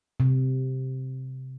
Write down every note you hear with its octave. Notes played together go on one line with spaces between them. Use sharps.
C3